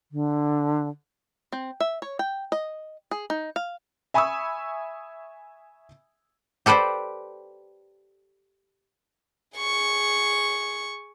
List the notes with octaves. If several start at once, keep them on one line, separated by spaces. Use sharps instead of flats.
D3
C4
E5
C#5
G5
D#5
G#4
D#4
F5
E5 G#5 B5 C#6 D#6 E6
G4 A4 B4 C5 D5
G#4 C#6